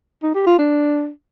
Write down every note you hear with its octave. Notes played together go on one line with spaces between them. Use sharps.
D#4
G4
F4
D4